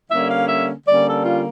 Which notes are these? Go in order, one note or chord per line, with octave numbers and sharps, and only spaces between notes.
D3 G3 A#3 C#4 E5
F5
E5
D3 G3 A#3 C#4 D5
A4
F4